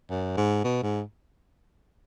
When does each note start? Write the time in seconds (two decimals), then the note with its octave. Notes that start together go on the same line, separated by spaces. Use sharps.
0.10 F#2
0.37 G#2
0.64 B2
0.83 G#2